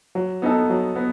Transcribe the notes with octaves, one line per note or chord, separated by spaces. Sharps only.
F#3
B3 D#4 A4
F#3
B3